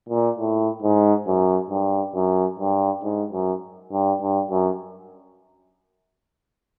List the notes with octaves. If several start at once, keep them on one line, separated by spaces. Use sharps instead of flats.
A#2
A2
G#2
F#2
G2
F#2
G2
G#2
F#2
G2
G2
F#2